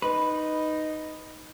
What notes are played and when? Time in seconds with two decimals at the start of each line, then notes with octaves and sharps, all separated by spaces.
0.02 D#4 B4